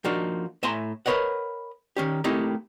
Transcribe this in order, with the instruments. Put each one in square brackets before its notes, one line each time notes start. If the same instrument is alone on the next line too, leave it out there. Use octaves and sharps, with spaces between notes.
[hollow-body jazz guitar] F3 A#3 D4 D#4 F#4
A2 E5 G#5 A#5 C6
A#4 B4 C#5 D#5 F#5
D#3 C#4 G4
A3 A#3 C4 D#4 E4 G4